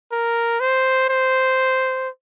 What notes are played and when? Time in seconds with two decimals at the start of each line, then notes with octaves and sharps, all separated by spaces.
0.12 A#4
0.60 C5
1.09 C5